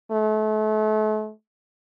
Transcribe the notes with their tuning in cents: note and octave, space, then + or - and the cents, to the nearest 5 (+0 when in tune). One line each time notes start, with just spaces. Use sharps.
A3 -35